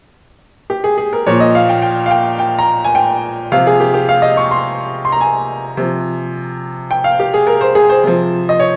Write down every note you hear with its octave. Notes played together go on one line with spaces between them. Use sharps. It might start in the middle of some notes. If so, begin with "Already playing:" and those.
G4
G#4
G#4
A#4
A#2 F3 C#5
D#5
F5
G5
G5
F5
G5
G5
A#5
G#5
G5
C3 F3 F5
G#4
G4
G4
F5
D#5
C#6
C6
C6
A#5
G#5
C3 F3
G5
F5
G4
G#4
A#4
C5
G#4
C5
C3 F3
D#5
C#5